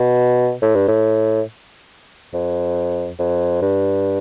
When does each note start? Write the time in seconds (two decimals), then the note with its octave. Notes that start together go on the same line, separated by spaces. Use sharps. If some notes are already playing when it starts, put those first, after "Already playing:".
Already playing: B2
0.62 A2
0.75 G2
0.88 A2
2.33 F2
3.19 F2
3.61 G2